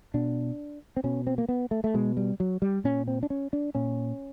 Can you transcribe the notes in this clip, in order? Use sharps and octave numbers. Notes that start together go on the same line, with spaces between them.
B2 D4
C4
B2 C#4
C4
A#3
B3
A3
A3
B2 G#3
G3
F#3
G3
A#2 C#4
C4
D4
C#4
D4
A#2 C#4